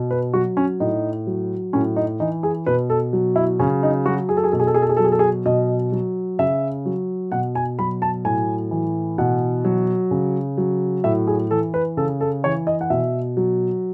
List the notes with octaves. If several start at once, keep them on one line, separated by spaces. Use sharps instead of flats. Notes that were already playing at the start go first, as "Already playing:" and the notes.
Already playing: B2
B4
F#3 F#4
C#4
A2 D#4
F#3
A2 C#4
D#4
E3 D#4
G#4
B2 B4
A4
F#3
E4
C#3 C#4
D#4
F#3 F#4
G#4
A4
G#4
B2 A4
G#4
A4
G#4
A4
G#4
A4
F#3
G#4
A4
G#4
B2 D#5
F#3
C#3 E5
F#3
B2 F#5
G#5
F#3 B5
A5
A2 G#5
E3
B2 F#5
F#3
C#3
F#3
A2 E5
G#4
E3 A4
B4
C#3 A4
A4
E3 C#5
D#5
F#5
B2 E5
F#3